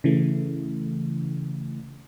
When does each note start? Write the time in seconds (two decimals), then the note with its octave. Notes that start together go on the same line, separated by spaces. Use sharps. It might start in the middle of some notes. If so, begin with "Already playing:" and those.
0.04 C#3 E3 A3